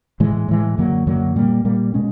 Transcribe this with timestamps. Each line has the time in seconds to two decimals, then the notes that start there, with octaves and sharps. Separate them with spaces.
0.20 A2 E3 G#3
0.48 A2 E3 G#3
0.78 F#2 D3 F#3 A#3
1.07 F#2 D3 F#3 A#3
1.36 A#2 G3 A#3
1.65 A#2 G3 A#3
1.94 B2 G#3 C#4